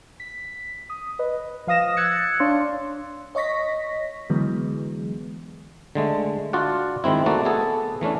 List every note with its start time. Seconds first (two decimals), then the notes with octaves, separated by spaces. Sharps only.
0.20 B6
0.90 D#6
1.19 B4 D#5
1.67 F3 F5 D#6 A#6 E7
1.97 E6 F#6 G#6 A6 C#7
2.40 D4 C#5 D5 F5 C6
3.35 C#5 D#5 C#6 A#6 B6
4.30 D3 E3 F#3 G#3 B3
5.95 D3 G#3 A3
6.53 D4 F4 F#4 D5 F#5
7.04 D#3 G#3 C4 E4
7.26 A3 A#3 F#4 D5
7.45 B3 G#4 A4
8.01 E3 A3 C#4 D4